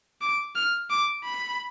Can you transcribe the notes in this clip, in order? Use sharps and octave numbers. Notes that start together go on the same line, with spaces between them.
D6
F6
D6
B5